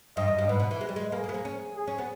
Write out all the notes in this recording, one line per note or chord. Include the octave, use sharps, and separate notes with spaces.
G2 D#5
E2
G2
G#2 B4
B2
E3
G#3
G3
G#3
A#3 G#4
A#3
B3
A#3
C#4
G#4
C#4
B3